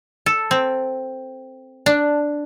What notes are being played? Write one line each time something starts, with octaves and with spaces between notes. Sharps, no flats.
A4
C4
D4